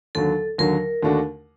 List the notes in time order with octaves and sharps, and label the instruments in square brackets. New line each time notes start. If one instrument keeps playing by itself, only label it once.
[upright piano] D#2 D3 F#3 [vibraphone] A4
[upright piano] D#2 D3 F#3 [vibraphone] A#4
[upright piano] D#2 D3 A3 D4 F#4